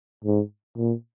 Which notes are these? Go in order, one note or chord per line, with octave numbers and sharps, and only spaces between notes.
G#2
A#2